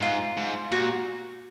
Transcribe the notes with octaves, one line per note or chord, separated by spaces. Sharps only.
G#2 F4
G#2
A#2 F#4